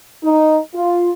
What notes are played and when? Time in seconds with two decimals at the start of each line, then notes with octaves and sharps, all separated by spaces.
0.24 D#4
0.75 F4